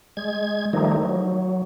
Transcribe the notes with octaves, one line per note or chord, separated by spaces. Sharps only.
G#3 G#6
D#3 F3 G3 A3 D#4
F#3